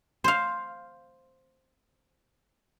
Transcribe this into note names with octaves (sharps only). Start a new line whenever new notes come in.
C5 F5